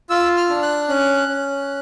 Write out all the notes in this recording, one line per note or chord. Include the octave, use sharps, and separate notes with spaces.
F4 E6
F6
D4
F#6
C#4 F#6
C#4